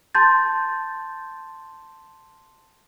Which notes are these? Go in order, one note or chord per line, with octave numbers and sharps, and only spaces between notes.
A5 C6 G6 A6